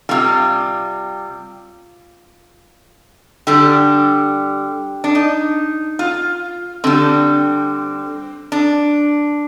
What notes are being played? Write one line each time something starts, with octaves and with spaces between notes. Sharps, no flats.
C3 G3 F4
D3 G3 G4
D4
D#4
F4
D3 G3 C4
D4